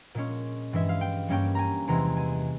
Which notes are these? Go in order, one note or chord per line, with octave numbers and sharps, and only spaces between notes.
A#2 G#3 C#4
G2 E3 G#3 E5
F5
G5
G2 G3 A#3 C#4 G5
G#5 A#5
E2 C3 E3 G#3 A#5
G#5